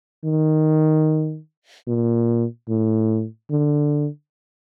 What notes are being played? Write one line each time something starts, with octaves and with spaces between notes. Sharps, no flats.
D#3
A#2
A2
D3